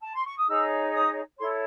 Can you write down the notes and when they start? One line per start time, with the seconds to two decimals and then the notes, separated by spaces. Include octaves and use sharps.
0.02 A5
0.13 C6
0.24 C#6
0.37 D#6
0.48 D#4 G#4 C#5 E6
0.93 D#6
1.38 E4 A4 C#5 C6